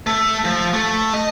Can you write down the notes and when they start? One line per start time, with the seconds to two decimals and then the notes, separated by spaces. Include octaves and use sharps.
0.07 A3
0.45 F3
0.74 A3
1.13 D#5